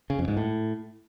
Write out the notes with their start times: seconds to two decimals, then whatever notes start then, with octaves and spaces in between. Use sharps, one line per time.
0.10 C#3
0.19 F2
0.28 G#2
0.37 A2